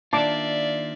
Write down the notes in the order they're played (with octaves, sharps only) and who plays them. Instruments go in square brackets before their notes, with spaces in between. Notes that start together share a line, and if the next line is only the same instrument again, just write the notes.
[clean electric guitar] D#3 A#3 F4 [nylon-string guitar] D4 [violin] D5 E5 [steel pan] A5 D6